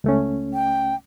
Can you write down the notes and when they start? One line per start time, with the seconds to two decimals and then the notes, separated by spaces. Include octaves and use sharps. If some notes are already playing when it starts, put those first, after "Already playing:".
0.04 C#2 A3 C#4
0.53 G5